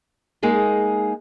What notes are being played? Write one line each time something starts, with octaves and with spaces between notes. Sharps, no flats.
G#3 A#3 D#4 G#4